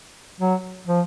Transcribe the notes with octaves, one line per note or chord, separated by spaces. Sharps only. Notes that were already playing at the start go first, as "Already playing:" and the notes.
F#3
F3